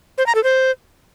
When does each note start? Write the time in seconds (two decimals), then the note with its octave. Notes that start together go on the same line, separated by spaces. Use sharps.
0.18 C5
0.26 A#5
0.35 A4
0.44 C5